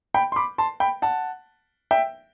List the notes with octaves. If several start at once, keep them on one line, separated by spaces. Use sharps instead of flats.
G5 B5
C6
B5 D6
A5 C6
G5 B5
F#5 A5
E5 G5